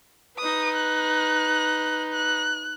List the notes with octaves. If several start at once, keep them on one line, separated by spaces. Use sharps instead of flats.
D#4 B4 D#6
F#6
F#6